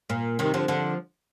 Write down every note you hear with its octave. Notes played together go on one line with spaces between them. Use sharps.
A#2
C3 D#3
D3 F3
D3 F3